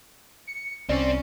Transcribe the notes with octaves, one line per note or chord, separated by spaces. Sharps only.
C#7
C2 C4 C#4 D5